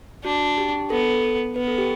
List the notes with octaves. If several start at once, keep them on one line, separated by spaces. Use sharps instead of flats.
D4 F#4
G4
B3 A4
B3 B4
A4
G4